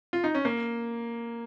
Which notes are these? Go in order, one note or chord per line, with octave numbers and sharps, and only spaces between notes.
F4
D#4
C#4
A#3